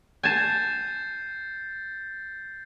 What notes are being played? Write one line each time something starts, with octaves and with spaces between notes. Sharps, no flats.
G#5 A5 G6 A6 C7